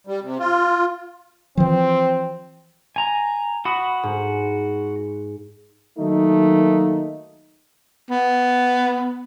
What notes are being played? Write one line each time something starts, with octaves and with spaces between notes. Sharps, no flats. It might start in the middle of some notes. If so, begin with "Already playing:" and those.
G3
C3
F4
E3 F3 C4
G#5 A#5
F#4 B5 D#6
G#2
D#3 F#3 A3 A#3 D#4
B3